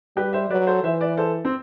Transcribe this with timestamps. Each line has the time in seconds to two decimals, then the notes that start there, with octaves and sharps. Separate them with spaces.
0.16 G3 G4 B4
0.33 C5 E5
0.50 F#3 B4 D5
0.67 A4 C5
0.84 E3 C5 E5
1.01 B4 D5
1.17 A4 C5
1.45 C4